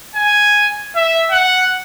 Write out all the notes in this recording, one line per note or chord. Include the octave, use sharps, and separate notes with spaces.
G#5
E5
F#5